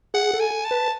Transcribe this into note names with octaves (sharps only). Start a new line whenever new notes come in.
G#4 F#5
A4
G#5
A5
B4